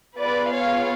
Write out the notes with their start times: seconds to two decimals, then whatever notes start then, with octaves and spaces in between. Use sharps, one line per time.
0.20 B3 F4 G#4 B4 D5
0.55 C#5 F5